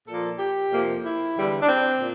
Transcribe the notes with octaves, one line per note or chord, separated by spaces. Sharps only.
A#2 F3 A#3 A4
G4
F2 C3 F3 A#3
E4
E2 D3 G3
D4
C4
A#2